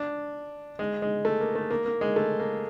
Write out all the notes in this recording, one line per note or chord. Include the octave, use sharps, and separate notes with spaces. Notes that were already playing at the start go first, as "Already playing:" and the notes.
Already playing: D4
G#3
G#3
A3
A#3
A3
A#3
A#3
G#3
A3
A#3